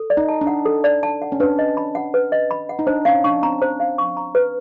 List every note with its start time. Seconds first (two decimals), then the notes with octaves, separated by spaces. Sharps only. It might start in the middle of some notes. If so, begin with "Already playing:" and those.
Already playing: A4
0.10 D5
0.17 D#4
0.29 A5
0.41 D4
0.47 F#5
0.66 A4
0.84 D5
1.03 A5
1.22 F#5
1.32 C#4
1.40 D4 B4
1.59 D#5
1.77 B5
1.95 F#5
2.14 B4
2.32 D#5
2.51 B5
2.69 F#5
2.79 D#4
2.87 D4 C5
3.05 C#4 F5
3.24 D4 C#6
3.43 C4 A#5
3.62 C5
3.80 F5
3.98 C#6
4.17 A#5
4.35 B4